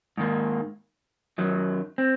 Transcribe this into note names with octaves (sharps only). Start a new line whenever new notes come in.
G#2 D#3 A#3
F#2 D#3 F#3
C4